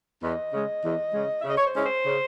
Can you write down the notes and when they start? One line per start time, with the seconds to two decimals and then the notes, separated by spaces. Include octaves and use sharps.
0.22 E2 D#5
0.52 C#3 G#3
0.83 E2
1.13 C#3 G#3
1.41 E5
1.44 C#3 D#5
1.57 C#5
1.65 C5
1.75 G#3 C#4 E4
1.85 C5
2.06 C#3